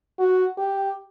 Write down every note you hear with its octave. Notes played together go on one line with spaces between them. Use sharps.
F#4
G4